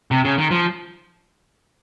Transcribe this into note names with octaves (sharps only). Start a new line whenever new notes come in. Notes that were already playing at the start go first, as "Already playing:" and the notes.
C3
C#3
D#3
F3